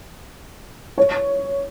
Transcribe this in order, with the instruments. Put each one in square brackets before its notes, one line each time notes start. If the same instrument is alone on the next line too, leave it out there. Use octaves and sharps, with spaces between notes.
[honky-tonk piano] C#5